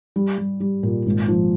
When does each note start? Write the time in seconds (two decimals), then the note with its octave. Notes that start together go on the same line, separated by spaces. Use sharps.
0.16 G3
0.38 G3
0.60 G3
0.83 A#2
1.06 G#1
1.28 F3